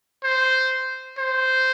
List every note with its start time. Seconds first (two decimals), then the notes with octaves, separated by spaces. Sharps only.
0.23 C5
1.19 C5